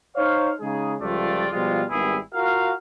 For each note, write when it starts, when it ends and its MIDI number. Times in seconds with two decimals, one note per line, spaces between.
0.16 0.51 63
0.16 0.51 72
0.16 0.51 73
0.16 0.51 77
0.60 0.95 49
0.60 0.95 56
0.60 0.95 63
0.60 0.95 68
1.00 1.47 37
1.00 1.47 53
1.00 1.47 55
1.00 1.47 57
1.00 1.47 65
1.00 1.47 74
1.52 1.82 47
1.52 1.82 53
1.52 1.82 55
1.52 1.82 56
1.52 1.82 65
1.90 2.17 32
1.90 2.17 55
1.90 2.17 59
1.90 2.17 64
1.90 2.17 68
2.34 2.72 65
2.34 2.72 66
2.34 2.72 70
2.34 2.72 77